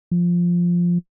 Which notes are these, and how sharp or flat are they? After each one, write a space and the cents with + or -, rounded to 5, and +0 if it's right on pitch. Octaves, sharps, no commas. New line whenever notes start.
F3 +0